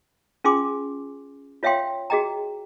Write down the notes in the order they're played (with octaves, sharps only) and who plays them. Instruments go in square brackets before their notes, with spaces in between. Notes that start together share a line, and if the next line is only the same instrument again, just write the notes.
[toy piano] C#4 F4 G#4 G#5 C6 D6
F4 C#5 E5 F5 G5 C6
F#4 G#4 D#5 G5 A#5